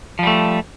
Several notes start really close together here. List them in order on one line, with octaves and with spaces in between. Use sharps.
F3 G3 A3